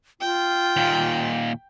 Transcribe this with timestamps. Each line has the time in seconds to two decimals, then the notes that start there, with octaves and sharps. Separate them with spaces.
0.20 F4 G5
0.76 D#2 A#2